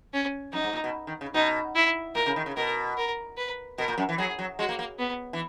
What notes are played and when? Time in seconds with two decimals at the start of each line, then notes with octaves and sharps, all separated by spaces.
0.14 C#4
0.53 F#2 D#4
0.64 G#2
0.73 A#2
0.84 B2
1.07 D#3
1.21 C#3
1.34 B2 D#4
1.75 E4
2.15 A#2 A#4
2.26 C#3
2.36 D#3
2.46 C#3
2.57 B2 A#4
2.97 A#4
3.37 B4
3.78 B2 A#4
3.88 A#2
3.98 F#2
4.09 E3
4.18 F#3 G#4
4.39 F#3
4.59 G#3 F#4
4.69 A#3
4.79 A#3
4.99 B3
5.33 E3